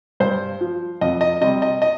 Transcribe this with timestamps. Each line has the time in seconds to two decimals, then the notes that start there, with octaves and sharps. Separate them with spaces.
0.20 G2 C5
0.61 F3
1.01 F2 D#5
1.21 D#5
1.41 C3 G3 D#5
1.62 D#5
1.82 D#5